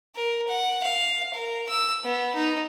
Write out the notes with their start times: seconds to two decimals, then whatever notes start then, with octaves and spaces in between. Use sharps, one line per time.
0.15 A#4
0.47 F#5
0.83 F5
1.34 A#4
1.69 E6
2.04 B3
2.35 D#4